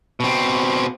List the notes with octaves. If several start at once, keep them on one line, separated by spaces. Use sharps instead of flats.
B2 C4